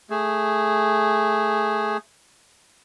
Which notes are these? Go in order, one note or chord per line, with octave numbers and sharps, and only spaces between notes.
A3 G#4